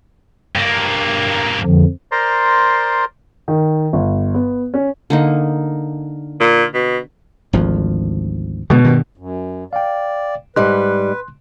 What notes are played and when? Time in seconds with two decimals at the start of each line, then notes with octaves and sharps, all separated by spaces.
0.55 G2 A#3
1.64 F2 D3 F3
2.12 A#4 C5 D5 A#5 C6
3.48 D#3
3.93 G1
4.34 B3
4.74 C#4
5.10 D3 A#3 D#4
6.40 A#2
6.74 B2
7.53 G#1 D2 F3
8.70 B2 D3 G#3
8.84 G2 D#3
9.17 F#2
9.73 D5 F5 G5
10.56 G#2 G3 B4 C6 F#6